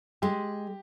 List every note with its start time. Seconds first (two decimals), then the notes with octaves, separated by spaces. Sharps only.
0.22 G#3 G4